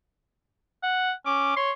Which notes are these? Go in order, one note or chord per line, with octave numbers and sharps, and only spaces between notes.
F#5
C#4 D6
C#5 C6